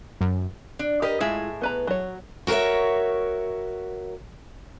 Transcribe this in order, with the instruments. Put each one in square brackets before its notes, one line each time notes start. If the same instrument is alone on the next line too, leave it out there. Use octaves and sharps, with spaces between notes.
[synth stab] F#2
[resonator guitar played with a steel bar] D4
[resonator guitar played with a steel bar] G4 B4 D#5 [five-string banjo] A#4
[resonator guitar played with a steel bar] A2 G#4 E5 [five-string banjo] G#3 E4 F4
[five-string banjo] B3 B4 A#5
F#3 C#5
[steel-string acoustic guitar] F#4 A#4 C5 C#5 E5